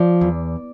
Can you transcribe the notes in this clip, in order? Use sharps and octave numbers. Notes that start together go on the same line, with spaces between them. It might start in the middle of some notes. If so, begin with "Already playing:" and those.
Already playing: F3 D5
E2